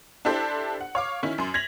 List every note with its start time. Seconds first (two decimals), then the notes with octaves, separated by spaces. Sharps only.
0.25 D4 E4 G4 A4 C5
0.81 F#5
0.95 C#5 F5 D6
1.23 D#3 C#4 E4
1.38 F#2 C6
1.54 G#6 A#6 B6 F7 F#7